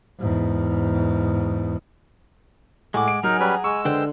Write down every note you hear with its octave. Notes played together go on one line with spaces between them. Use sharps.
E2 G#2
A2 G#3 F#5 G#5 D6
D7
F#3 D#4 G#4 A#4 A#5
G3 C#4 B4
G#3 C#6 E6
D3 B4 C5 G5